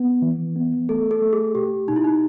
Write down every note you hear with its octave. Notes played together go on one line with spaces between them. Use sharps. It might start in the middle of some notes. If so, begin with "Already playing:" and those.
Already playing: B3
E3
B3
A3 A4
A4
A3
G#4
B2 G4
B2 D#4
E4
D#4